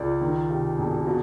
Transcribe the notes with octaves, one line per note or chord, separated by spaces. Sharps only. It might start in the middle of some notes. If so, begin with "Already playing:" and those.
Already playing: C#2 D5
D#3
C3
E1
B2